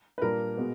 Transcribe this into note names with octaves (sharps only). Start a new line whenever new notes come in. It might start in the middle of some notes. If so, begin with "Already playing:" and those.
B4
A#2 G3 A#3 D4 A#4
B2 G#3 B3